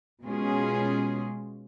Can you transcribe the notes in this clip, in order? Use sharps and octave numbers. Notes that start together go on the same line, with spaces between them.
B2 G#3 C#4 F4 G#4